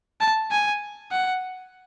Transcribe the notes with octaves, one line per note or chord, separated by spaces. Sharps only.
A5
G#5
F#5